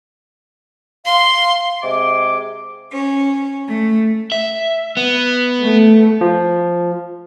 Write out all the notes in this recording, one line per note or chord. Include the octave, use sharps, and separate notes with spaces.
F5 C6
C3 G#3 G#4 D6
C#4
A3
E5
B3
A3
F3